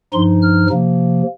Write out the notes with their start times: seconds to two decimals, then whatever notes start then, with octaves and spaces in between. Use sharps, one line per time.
0.13 G2 F3 D#4 C6
0.42 F6
0.70 C3 F3 A#3